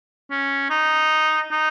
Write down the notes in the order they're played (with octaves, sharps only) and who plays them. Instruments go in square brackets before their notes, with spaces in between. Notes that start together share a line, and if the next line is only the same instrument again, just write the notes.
[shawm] C#4
D#4
D#4